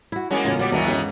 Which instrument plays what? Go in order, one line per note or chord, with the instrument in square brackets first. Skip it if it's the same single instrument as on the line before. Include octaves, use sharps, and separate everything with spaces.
[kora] E4 F#4
[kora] G#3 F#4 [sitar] A#3 B3 C#4
[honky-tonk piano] E2 A2 C#3 [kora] F4 C#5
[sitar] G3 B3 [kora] F#4 D5
[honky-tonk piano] D2 G2 B3 [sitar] B2 D#3 E3
[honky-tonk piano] G1 G#3 C#4